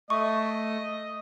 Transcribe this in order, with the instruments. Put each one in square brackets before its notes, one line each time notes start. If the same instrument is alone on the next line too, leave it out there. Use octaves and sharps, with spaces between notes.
[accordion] A3 [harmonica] D#5 [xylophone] C#6